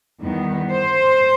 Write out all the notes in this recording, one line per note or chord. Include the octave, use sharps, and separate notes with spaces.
E2 D#3 G3 B3
C5